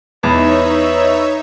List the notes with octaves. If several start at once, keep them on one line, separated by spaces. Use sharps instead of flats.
E2 D#4 B4 C#5 E5